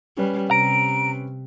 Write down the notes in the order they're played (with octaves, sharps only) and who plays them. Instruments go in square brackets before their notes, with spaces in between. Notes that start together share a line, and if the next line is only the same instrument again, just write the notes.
[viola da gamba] G3 [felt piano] C#4 B4
[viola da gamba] C3 [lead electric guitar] A#5 [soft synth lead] D7